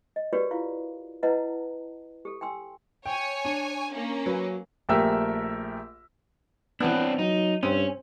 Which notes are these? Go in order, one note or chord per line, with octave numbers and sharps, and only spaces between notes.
D#5
F#4 G4 A#4 B4 C#5 D5
E4 F4 F5
E4 B4 D#5 F#5 A5 A#5
G4 A4
G5 G#5 C6 E6
C#5 G5 G#5
D4
A#3 C#4
F#3 B4
A#1 A3 G4 A#4 E5 E6
E3 B3 C4 D4
F#3 D#4
G2 C4 C#4